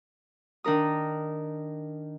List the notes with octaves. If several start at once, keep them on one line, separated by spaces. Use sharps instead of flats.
D#3 D4 A#4 D#6